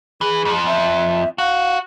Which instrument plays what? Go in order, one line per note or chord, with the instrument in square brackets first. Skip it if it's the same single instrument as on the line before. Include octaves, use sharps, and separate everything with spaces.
[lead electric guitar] E3 [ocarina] G#4
[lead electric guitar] F2 F3
[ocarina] E5
[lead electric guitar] F#4 [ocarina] F5